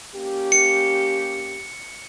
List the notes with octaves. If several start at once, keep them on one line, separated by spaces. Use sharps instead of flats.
A#3 C#4 G4
C#7